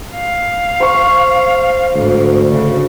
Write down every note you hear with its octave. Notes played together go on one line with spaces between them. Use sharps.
F5
C5 C#6
D2 G#2
C#3